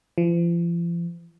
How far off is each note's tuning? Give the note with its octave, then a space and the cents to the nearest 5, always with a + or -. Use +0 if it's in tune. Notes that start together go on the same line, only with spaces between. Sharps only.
F3 -40